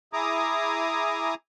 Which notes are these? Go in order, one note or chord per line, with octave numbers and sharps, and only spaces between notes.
E4 G#4 G#5 A#5 D6 D#6